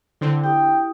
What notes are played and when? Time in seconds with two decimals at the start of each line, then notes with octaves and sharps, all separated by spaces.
0.21 D3 C4 E4
0.44 E4 G4 G5 D#6